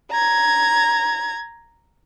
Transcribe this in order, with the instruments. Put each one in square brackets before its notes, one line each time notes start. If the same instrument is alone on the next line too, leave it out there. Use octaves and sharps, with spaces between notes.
[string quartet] A#5 G#6